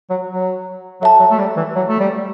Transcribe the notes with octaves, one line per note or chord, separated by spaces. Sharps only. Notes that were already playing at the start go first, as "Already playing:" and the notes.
F#3
F#3
F#3 A4 E5 A5
F#3
A3
G3
E3
F#3
A3
G3